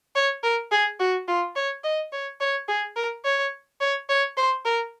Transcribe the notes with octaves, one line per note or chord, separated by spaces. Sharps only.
C#5
A#4
G#4
F#4
F4
C#5
D#5
C#5
C#5
G#4
A#4
C#5
C#5
C#5
C5
A#4